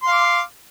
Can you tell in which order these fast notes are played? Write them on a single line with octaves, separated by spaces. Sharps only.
C6 F5 D6